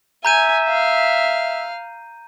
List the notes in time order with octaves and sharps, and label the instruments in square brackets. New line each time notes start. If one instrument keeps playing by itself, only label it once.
[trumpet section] E5 [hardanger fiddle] G#5 [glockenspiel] A#5 G6 D#7
[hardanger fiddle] F5